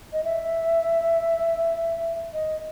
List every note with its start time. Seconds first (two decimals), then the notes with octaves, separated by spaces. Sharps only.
0.13 D#5
0.24 E5
2.34 D#5